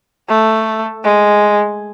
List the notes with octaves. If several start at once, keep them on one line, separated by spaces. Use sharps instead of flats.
A3
G#3